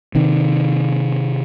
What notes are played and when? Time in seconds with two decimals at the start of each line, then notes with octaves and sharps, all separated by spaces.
0.15 C3 D#3